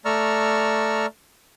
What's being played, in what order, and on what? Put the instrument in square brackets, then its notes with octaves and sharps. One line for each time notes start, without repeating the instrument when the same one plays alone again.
[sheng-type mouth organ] A3 D5 A#5 C#6 E6 F6